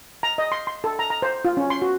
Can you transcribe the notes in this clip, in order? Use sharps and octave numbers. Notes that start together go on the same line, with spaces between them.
A#5
D#5
C6
C6
A4
A#5
A#5
C5
F4
C#4
C6
F#4